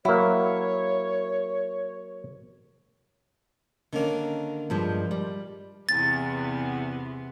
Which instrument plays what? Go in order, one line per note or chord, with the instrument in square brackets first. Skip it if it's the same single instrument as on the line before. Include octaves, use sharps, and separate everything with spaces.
[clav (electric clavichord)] F#3 A#3 [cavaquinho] E4 [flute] C#5
[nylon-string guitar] D3 C#4 [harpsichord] D#3 A#3
[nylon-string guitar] G2 F3 G#3
G3
[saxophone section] E2 [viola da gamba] C3 B3 [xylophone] A6